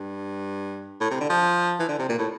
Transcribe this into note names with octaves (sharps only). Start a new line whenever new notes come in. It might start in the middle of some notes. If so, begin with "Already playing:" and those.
Already playing: G2
A2
C3
D3
F3
E3
D3
C3
A#2
A2